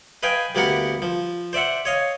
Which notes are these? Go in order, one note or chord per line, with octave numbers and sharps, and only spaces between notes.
B4 D#5 F5 G5 G#5
D2 G3 A#3 B3 A#4 F#5
F3
C5 D5 E5 F#5
C#5 D#5 F5